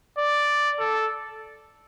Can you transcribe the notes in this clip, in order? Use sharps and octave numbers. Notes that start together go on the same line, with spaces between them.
D5
A4